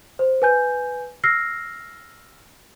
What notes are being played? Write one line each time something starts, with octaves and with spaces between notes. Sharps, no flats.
C5
B4 G#5 G6
E6 F6 A#6 C7